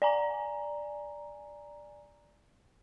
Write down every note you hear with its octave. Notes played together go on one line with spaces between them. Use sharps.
D5 G#5 A#5